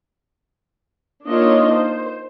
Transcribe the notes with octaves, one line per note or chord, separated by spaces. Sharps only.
A#3 D4 D#4 F4 C#5 D#5
C5